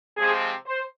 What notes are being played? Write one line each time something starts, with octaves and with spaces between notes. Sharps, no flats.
C3 F3 G#3 C4 G#4
C5